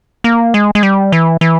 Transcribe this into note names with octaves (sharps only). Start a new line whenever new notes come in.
A#3
G#3
G#3
G3
E3
E3